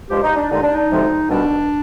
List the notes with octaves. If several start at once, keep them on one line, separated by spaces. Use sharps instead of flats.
G2 F3 G#3 G4
D#4
D4
D#2 D3 G#3 D#4
D4
D#4
D2 C3 F3 G#3
C2 B2 G3 D4